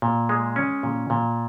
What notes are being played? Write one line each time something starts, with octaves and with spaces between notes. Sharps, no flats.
A#2
G#3
C#4
A#2
A#2